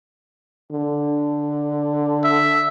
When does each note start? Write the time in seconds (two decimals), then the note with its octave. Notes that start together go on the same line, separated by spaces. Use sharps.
0.71 D3
2.24 E5